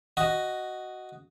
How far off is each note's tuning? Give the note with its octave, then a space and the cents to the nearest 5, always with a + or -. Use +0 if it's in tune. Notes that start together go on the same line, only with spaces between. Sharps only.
F#4 +5 D#5 +0